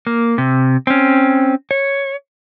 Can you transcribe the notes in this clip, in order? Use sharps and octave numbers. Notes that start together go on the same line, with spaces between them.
A#3
C3
C4 C#4
C#5